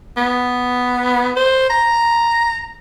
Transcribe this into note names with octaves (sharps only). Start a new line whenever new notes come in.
B3
C5
A#5